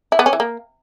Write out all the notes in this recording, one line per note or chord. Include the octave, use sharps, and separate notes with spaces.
E4
B3
C#4
E3
A#3